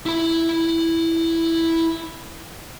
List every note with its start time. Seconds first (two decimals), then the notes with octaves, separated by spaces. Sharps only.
0.06 E4 B5